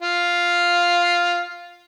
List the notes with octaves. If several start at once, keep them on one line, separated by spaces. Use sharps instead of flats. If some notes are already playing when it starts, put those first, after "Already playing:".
F4 F5